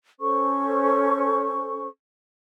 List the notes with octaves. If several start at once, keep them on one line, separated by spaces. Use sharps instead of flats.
C#4 A4 C5 C#6